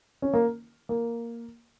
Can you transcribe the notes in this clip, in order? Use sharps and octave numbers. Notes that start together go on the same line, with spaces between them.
C#4
A#3
A#3